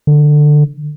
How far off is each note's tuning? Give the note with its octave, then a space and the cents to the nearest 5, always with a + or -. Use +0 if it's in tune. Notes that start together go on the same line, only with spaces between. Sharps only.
D3 +15